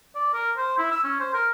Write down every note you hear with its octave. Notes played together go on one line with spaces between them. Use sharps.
D5
A#4
C5
E4
E6
C#4
C5
A#4